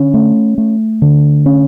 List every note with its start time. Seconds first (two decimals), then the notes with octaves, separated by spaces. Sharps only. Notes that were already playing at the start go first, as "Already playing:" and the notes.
Already playing: D3 C#4
0.14 A3
0.58 A3
1.02 D3
1.46 C#4